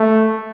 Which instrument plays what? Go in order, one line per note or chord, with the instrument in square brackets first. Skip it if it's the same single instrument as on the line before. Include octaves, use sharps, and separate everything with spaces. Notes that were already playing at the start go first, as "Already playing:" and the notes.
Already playing: [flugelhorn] A3